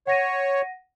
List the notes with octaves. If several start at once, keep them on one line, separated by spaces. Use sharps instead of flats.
C#5 F#5 A#6 D#7